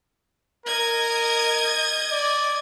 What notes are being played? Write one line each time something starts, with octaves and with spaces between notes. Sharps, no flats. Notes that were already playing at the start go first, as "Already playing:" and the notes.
A#4 D#5 G#6
D5